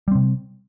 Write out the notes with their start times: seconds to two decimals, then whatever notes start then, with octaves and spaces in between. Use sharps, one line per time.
0.08 G3
0.11 C4
0.15 C3